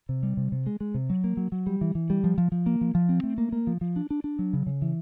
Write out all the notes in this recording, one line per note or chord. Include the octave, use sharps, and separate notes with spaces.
C3
G3
C3
C3
G#3
G#3
C3
F#3
A#3
F#3
F#3
G3
E3
E3
G3
F3
F3
F3
A#3
F3
F3
C4
A3
A#3
A#3
F3
F3
D4
D4
D4
F#3
C#3
C#3
E3